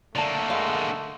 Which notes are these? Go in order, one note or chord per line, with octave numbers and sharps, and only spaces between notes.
D3 A3 A#3 D5 A5
G#3 F5